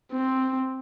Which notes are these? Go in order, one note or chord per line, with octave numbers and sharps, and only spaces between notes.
C4